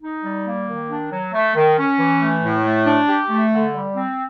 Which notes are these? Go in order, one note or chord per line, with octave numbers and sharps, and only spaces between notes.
D#4
G3
A#3
D#3
D4
F#3
A3
D#3
C#4
E3
A3
A2
A3
D4
G4
A3
D3
G3
C4